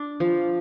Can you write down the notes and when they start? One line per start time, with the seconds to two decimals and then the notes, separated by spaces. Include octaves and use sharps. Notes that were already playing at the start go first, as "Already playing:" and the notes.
Already playing: D4
0.20 F3